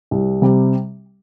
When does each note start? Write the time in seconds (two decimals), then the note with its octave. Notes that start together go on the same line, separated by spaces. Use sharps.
0.11 C2
0.42 C3 G3